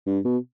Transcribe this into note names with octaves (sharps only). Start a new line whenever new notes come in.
G2
B2